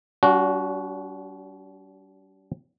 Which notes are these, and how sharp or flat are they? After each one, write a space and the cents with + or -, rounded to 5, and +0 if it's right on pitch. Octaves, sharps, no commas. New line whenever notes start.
G3 -35 D4 -45 F#4 +0